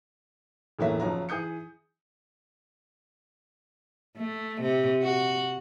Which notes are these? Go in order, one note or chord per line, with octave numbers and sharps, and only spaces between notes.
E1 A2 E3 F#3 A#3 E5
F#1 F3 F#3 A#5
E3 G#4 D#6 G6 C#7
A3
C3
F#4